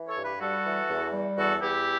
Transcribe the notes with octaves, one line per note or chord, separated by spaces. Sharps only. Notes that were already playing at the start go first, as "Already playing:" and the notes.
Already playing: E3
A4 C#5
G2
G4 B4
G3 F#4 A4
E3
E2
G3
E2 F#4 A4
E2 E4 G4